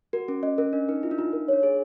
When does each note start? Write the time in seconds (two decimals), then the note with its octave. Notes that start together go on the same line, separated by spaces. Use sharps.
0.13 F#4 A#4
0.28 C#4 A#4
0.43 C#4 D#5
0.58 C#4 A#4
0.73 D4 D#5
0.88 D#4 A#4
1.03 E4 F4
1.11 D4
1.18 D#4 F4
1.33 A#4
1.48 D4 C#5
1.63 G#4 C#5